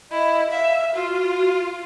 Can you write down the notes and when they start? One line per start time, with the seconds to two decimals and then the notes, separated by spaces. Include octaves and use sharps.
0.11 E4 D#5
0.51 E5 F5
0.95 F4 F#4